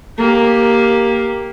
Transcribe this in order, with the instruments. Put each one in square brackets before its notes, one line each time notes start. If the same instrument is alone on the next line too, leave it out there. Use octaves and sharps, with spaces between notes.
[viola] A#3 G4